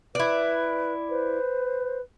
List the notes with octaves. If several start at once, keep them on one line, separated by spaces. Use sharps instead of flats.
E4 B4 D5
B4 C5